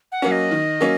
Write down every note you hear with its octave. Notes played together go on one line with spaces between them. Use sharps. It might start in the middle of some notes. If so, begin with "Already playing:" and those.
F#5
F#3 A#3 C#4 F#4
D#5
D#3
F#3 A#3 C#4